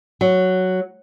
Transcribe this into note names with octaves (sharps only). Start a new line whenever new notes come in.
F#3